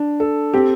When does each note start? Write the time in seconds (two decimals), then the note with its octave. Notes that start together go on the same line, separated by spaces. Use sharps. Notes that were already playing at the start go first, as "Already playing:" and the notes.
Already playing: D4
0.20 A4
0.54 C4 G4